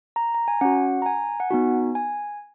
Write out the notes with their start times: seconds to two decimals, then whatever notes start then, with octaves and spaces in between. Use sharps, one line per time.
0.16 A#5
0.35 A#5
0.48 G#5
0.61 C#4 F#4 F#5
1.02 A#5
1.06 G#5
1.40 F#5
1.51 B3 D#4 F#4 G#5
1.95 G#5